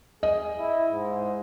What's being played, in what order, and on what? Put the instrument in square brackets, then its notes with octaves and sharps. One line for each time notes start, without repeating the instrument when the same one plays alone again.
[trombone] G#4 [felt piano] D#5
[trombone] E4
G#2